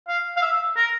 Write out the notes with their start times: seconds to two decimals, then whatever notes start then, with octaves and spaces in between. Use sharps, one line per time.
0.08 F5
0.37 F5
0.42 E5
0.76 A#4